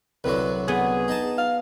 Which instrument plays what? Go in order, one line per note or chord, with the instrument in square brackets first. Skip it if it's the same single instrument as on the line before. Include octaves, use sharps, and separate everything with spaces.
[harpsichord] C2 D3 F#3 [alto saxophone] B4
[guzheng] B3 [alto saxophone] G#4
[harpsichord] D#4 A5
[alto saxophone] F5